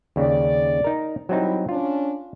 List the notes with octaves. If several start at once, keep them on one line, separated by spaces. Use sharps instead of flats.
D#2 C#3 D5
D#4 A#4
F#3 G3 C4 D#4 E4
C#4 D4 F4